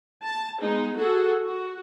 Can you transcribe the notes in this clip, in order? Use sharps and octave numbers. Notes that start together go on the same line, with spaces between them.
A5
G#3 B3 D#4
F#4 G#4 A4
F#4